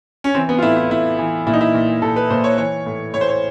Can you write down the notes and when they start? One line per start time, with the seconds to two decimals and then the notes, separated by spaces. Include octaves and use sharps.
0.24 C#4
0.35 E3 C4
0.49 B3
0.58 F4
0.62 A2 E4
0.76 E4
0.90 A2 E4
1.19 E3
1.47 A#2 E4
1.53 D#4
1.61 E4
1.74 A#2
2.02 A#2 A4
2.16 B4
2.30 A#2 C5
2.44 C#5
2.58 E3 C#5
2.86 A2
3.14 A2 C#5
3.21 C5
3.29 C#5